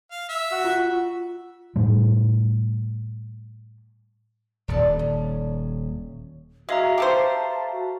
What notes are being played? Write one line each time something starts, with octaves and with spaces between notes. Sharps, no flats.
F5
E5
F#4
F4
A2 G3 A3
D#1 D4 B4 A5
C#4
G#3 F#4 E5 F5 A#5
G4 A4 C5 A5
F#4